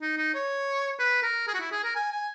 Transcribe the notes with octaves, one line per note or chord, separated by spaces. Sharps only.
D#4
D#4
C#5
B4
A#4
G#4
F#4
E4
G#4
A#4
G#5
G#5